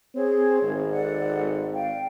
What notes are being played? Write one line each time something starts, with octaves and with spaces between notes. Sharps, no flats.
C4 G#4 C#5
G#1
A4 D5 F#5
D5 F5 G5